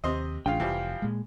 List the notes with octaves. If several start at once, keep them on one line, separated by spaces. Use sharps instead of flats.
D#2 C3 C5 D#5
A1 C#3 D4 F4 F5 G5
F1 E3 F3 G3
A#2 G#3